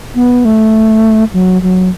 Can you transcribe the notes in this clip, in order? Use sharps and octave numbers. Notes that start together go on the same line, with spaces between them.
B3
A3
F#3
F#3